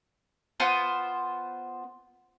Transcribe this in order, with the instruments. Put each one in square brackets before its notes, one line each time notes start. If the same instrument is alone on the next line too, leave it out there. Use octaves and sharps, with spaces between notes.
[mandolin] B3 F4 C5